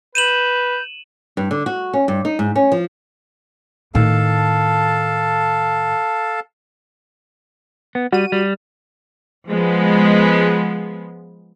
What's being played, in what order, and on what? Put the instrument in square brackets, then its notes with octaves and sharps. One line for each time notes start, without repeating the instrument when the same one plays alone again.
[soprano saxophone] B4 [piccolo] G6 [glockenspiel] D#7 E7 F#7
[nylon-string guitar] G2
D3
F#4
C#4
G2
D#4
G#2
C#4
F3
[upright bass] A2 D#3 [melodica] A4 F5 A5
[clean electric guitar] B3
[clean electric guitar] G3 [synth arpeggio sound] F#4 D#7
[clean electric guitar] G3
[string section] F3 G#3 B3